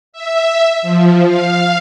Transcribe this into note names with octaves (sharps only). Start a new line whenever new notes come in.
E5
F3
F5